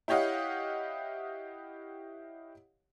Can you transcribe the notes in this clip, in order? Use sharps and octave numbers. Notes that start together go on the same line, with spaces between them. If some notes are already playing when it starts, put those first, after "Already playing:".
E4 G4 C#5 D#5 F5 F#5